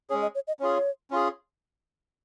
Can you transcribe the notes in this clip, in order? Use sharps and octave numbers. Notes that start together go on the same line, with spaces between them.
G#3 C#4 G#4 C#5
D#5
C#5
D#5
C#4 F4 G#4 C#5
C#4 F4 G#4